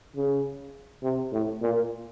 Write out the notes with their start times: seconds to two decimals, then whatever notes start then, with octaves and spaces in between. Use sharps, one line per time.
0.16 C#3
1.03 C3
1.32 A2
1.62 A#2